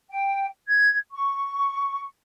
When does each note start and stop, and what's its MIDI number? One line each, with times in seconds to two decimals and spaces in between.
0.10 0.45 79
0.68 0.96 92
1.12 2.05 85